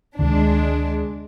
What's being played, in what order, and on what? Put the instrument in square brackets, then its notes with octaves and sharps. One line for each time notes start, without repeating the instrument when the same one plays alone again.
[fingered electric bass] D2 C3 D#3 [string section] G#3 D4